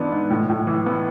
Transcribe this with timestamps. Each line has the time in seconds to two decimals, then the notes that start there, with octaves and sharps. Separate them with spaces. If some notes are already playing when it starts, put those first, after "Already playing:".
Already playing: G#2 E3 B3 D4
0.12 G#2
0.30 A2
0.49 A2
0.67 E3
0.86 B3